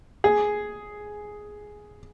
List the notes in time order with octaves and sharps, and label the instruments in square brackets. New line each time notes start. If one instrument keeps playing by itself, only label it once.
[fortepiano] G#4